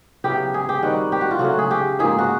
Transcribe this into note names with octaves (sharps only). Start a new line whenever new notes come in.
C#3 F#3 B3 E4 G4
G#4
G4
D#3 G3 C4 D#4 F#4
G4
F#4
F4
C#3 F#3 A3 F#4
G#4
G4
G#2 F3 A#3 G#4
F#4